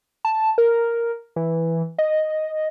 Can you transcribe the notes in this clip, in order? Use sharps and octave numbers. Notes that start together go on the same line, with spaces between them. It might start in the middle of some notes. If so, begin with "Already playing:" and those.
A5
A#4
E3
D#5